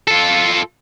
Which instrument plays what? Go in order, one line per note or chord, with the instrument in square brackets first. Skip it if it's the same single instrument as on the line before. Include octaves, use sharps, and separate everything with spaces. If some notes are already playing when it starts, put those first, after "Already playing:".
[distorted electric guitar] F4 A4